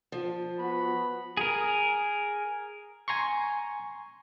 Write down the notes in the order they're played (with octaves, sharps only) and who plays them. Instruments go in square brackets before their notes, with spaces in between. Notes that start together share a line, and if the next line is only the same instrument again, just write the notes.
[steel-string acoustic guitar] F3
[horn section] B3 F#4 B5
[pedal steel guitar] G#4 A#4
[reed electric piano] G#5 A#5 C6 C#6